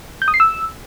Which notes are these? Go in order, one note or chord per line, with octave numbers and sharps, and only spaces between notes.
G6
D#6
C7
E6